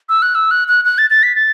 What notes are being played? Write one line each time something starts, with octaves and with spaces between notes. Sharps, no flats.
E6
F#6
E6
F#6
F#6
F#6
A6
A6
B6
A6